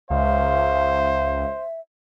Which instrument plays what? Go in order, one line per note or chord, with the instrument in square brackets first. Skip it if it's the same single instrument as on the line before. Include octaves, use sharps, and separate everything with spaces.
[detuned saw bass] C#2 [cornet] C5 [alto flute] E5 [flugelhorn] F5